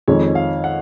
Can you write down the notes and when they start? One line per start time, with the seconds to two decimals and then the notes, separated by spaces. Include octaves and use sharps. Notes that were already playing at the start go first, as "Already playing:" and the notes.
0.08 F2 D#3 G#3 C#5
0.35 F5
0.64 F#5